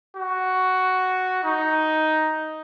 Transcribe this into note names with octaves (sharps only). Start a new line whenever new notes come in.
F#4
D#4